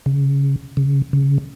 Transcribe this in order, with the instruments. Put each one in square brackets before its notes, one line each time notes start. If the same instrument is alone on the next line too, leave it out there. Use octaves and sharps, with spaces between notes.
[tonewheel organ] C#3
C#3
C#3